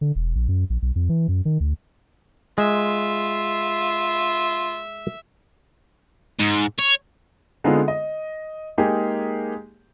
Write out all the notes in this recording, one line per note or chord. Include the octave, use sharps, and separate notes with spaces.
D3
E1
A#1
F#2
A#1
B1
F2
E3
F#2
D#3
D2
G#3 F4 E5
G#2
C#5
D3 G#3 B3 C4 D#4 F4
D#5
G#3 A#3 D#4 G4 G#4